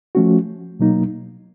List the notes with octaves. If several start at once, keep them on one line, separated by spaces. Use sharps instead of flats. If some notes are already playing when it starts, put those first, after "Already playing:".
F3 A3 C#4 F#4
B2 F#3 A#3 D#4